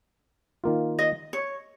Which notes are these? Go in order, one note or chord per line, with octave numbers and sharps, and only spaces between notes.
D#3 A#3 F4
D#5
C#5